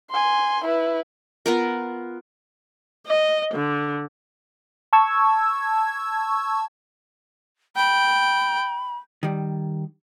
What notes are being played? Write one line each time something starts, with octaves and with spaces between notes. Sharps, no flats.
G#5 C6
E4 B4
B3 F4 A#4
D#5
D3
A5 C#6 E6 G#6
G5 B5
D#3 G3